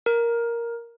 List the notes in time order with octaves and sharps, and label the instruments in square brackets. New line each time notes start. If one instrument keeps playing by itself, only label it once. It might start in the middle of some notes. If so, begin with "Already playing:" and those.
[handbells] A#4